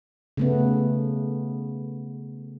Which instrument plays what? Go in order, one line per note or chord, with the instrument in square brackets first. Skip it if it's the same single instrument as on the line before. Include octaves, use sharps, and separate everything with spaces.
[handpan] C#3 A3 B3